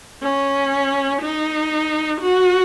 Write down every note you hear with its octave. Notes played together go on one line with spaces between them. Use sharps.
C#4
D#4
F#4